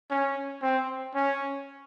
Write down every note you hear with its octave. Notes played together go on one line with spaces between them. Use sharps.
C#4
C4
C#4